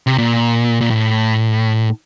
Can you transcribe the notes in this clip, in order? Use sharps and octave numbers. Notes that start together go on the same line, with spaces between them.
C3
A#2
A#2
A2